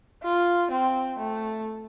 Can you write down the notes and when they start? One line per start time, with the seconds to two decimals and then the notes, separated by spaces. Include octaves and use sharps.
0.23 F4
0.72 C4
1.19 A3